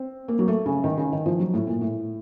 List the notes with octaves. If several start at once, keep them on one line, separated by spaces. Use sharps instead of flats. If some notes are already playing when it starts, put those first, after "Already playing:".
Already playing: C4
A#3
F#3
A3
C#3
D#3
C#3
D#3
F3
F#3
A2
A#2
A2